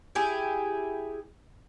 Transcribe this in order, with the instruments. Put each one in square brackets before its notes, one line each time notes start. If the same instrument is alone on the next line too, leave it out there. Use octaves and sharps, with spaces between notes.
[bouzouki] E4 G4 G#4